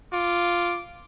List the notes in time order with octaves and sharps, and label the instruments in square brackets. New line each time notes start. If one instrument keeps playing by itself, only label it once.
[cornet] F4 [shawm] D6